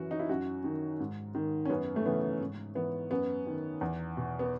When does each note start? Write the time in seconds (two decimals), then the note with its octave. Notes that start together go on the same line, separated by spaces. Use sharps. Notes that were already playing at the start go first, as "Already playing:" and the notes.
Already playing: F#2 E3 F#4
0.11 D#4
0.19 E4
0.29 F#2 F#4
0.64 D#3
1.00 G#2
1.35 D#3
1.65 C#4
1.70 F#2 B3
1.96 A3
2.06 C#3 E3 B3
2.40 G#2
2.75 E3 B3
3.11 F#2 B3
3.47 D#3
3.81 E2
4.17 B2
4.39 B3